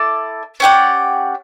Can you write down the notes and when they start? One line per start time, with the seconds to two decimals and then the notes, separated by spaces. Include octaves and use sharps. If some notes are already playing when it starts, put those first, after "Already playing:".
Already playing: E4 A4 D5
0.60 C#4 G4 D5 F#5